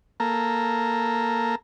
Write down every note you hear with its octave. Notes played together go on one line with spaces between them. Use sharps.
A#3 A4 A#5